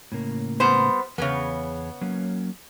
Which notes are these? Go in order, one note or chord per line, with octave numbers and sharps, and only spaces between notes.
A2 C#3 A#3
G3 B3 C5
E2 C#3 B3 G#4 C#5
F#3 A#3 C#4